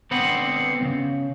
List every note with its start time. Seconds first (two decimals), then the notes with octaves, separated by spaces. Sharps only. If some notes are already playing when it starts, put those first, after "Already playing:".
0.11 D3 B3 C4 D4 F#5 B5
0.81 C#2 C#3